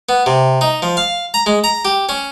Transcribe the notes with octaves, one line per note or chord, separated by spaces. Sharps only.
B3
C3
D#4
F3
F5
A#5
G#3
A#5
G4
C#4